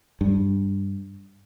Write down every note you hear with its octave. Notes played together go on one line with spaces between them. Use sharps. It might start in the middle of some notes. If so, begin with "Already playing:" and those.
G2